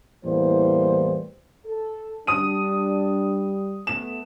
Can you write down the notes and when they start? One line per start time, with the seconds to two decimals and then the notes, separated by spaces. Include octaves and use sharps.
0.24 E2 A2 E3 G3 A#3 C5
1.66 A4
2.27 G3 D4 D#6 D#7
3.87 A3 B3 E7